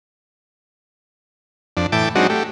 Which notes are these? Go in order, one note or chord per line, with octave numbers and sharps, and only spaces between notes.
F2 D4
A2 E3 G5 A5 D6
F#3 G#3 C4 D4 D#4 F#4
A3 G4